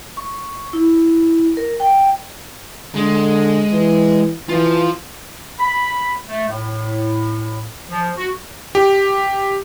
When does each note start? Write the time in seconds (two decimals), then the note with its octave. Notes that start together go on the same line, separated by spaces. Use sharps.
0.17 C#6
0.73 E4
1.57 A#4
1.80 G5
2.96 D3 G#3
3.72 E3
4.49 E3 F4 C5
5.59 B5
6.27 A3
6.49 A2
7.89 F3
8.17 F#4
8.75 G4